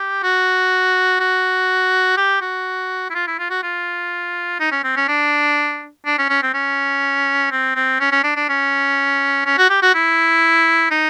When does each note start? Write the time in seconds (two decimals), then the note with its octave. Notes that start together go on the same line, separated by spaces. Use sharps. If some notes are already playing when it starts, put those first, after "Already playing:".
Already playing: G4
0.23 F#4
1.20 F#4
2.17 G4
2.42 F#4
3.10 E4
3.15 F4
3.27 E4
3.39 F4
3.50 F#4
3.64 F4
4.60 D#4
4.72 C#4
4.84 C4
4.97 C#4
5.08 D4
6.06 D4
6.18 C#4
6.30 C#4
6.43 C4
6.54 C#4
7.52 C4
7.76 C4
8.00 C#4
8.12 C#4
8.24 D4
8.36 D4
8.49 C#4
9.46 C#4
9.58 F#4
9.70 G4
9.82 F#4
9.94 E4
10.91 D#4